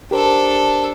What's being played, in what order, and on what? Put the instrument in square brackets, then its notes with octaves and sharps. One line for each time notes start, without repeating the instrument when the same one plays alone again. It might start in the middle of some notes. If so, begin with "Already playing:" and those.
[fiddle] D4 A4 [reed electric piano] G4 A#4 C5